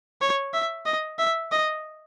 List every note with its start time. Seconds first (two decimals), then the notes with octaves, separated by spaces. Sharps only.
0.21 C#5
0.54 E5
0.86 D#5
1.19 E5
1.52 D#5